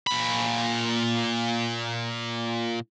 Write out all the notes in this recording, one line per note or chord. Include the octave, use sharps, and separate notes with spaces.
A#2 B5